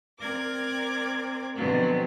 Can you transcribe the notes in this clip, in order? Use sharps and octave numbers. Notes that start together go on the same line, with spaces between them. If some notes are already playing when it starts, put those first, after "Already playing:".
C4 A#4 D5 D6 G#6
B2 D3 F3 F#3 B3 C4